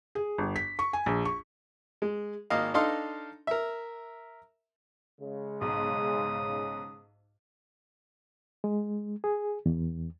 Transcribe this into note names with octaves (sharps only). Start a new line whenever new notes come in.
G#4
G1
B6
C#6
G#5
A#1
C#6
G#3
G#1 A#3 D#5 F5
D4 D#4 A4 D#5 F5 C6
A#4 E5
C#3 G#3
B1 G#2 D#6
G#3
G#4
E2